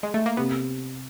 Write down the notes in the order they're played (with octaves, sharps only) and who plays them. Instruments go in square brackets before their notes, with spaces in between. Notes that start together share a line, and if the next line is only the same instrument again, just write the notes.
[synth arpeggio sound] G#3
A3
A#3
[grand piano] C3 [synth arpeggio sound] B3